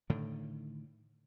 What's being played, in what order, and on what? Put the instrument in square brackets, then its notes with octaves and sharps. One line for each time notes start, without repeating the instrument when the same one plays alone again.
[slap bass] A2 D3 D#3